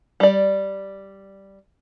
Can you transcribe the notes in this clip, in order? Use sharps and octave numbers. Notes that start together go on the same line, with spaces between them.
G3 D5